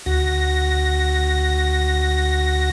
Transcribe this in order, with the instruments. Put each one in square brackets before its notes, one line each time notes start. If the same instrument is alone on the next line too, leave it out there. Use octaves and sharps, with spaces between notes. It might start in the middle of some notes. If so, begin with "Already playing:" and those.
[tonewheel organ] D2 F#4 A#6